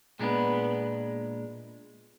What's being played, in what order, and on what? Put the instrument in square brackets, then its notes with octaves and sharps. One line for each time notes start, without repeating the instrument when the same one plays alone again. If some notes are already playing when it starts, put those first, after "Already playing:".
[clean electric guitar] A#2 G#3 D4 [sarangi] B3